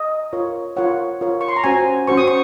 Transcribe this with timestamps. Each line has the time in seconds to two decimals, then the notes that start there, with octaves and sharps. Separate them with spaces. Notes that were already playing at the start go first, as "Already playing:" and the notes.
Already playing: D#5
0.33 F4 A#4 C#5
0.77 F4 A#4 C#5 F#5
1.21 F4 A#4 C#5
1.41 C#6
1.48 C6
1.56 A#5
1.64 C#4 F#4 C5 G#5
2.07 C#4 F#4 C5 C#6
2.17 D#6
2.28 C#6